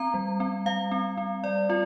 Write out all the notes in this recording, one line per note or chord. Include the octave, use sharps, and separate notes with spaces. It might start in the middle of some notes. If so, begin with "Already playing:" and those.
Already playing: C4 A#5
G3
C4
G3 F5
C4
C4
G3 D5
C4 F4